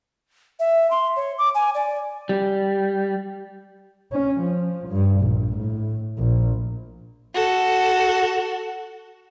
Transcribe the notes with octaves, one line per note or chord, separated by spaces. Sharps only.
E5
C6
C#5
D6
G#5
D5
G3
C#4
F3
G2
A#1
A2
A#1
F#4 A4